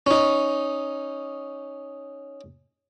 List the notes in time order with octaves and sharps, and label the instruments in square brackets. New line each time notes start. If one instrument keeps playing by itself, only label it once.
[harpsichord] C#4 D#4